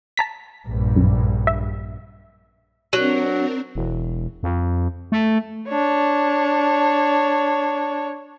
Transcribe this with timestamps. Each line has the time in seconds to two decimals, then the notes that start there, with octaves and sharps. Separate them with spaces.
0.17 A5 A#5 B6
0.64 A#1 G2
0.96 F#2
1.47 E5
2.93 F#3 C4 D4 A#4
3.75 E1
4.43 F2
5.12 A3
5.68 D4 C#5